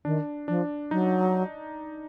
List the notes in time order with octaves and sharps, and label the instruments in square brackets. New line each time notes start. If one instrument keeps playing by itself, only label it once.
[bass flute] D#3 [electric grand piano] D4
[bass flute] F3 [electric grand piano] D4
[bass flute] F#3 [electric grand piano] D#4